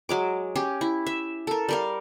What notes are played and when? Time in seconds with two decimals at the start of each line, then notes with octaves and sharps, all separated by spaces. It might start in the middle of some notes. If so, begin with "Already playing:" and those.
0.09 F#3 G#3 D6
0.55 C#4 G4
0.81 E4
1.06 E5
1.47 A4 A#4
1.69 G3 A#4 F5